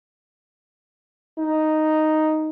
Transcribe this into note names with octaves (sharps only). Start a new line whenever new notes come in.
D#4